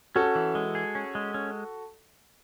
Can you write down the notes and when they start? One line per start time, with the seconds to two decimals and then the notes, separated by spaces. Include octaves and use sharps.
0.15 C#4 F#4 A4
0.35 E3
0.55 G#3
0.75 G#4
0.95 C#4
1.15 G#3
1.34 C#4